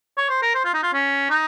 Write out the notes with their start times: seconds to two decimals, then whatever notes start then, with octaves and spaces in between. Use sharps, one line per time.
0.17 C#5
0.29 C5
0.42 A#4
0.55 C5
0.65 F4
0.74 D#4
0.83 F4
0.93 C#4
1.30 D#4